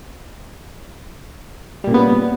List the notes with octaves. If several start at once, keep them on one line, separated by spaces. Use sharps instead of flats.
A#2 C#3 G3 B3